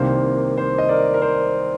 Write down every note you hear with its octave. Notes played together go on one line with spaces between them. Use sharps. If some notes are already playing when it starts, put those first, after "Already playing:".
Already playing: C2 C3 D#3 A#3 C5
C5
D#5
A#4 D5
A#4
C5